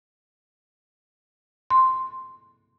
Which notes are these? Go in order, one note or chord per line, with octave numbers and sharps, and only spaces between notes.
C6